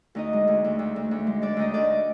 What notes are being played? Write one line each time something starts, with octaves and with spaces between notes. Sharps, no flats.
D2 D#4 D#5
G#3
D2
D2
D2
D2
D2
G#3
G#3 D4 D5
D2 D#4 D#5
D2 D4 D5